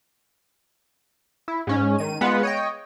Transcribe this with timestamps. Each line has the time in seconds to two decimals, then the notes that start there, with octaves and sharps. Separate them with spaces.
1.48 E4
1.67 G#2 C#4
1.98 D#3 D#7
2.21 G#3 B3 F4 B4 F#5
2.43 C#5 D#5 G5